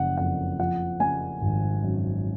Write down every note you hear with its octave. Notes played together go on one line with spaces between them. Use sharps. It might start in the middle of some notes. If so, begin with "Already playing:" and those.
Already playing: F#1 F3 F#5
F2 F#5
F3 F#5
C#3 G#5
G#1
F#2